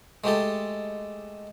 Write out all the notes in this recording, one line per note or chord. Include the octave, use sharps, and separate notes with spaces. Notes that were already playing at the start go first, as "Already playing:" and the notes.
G#3 A3 G4 A4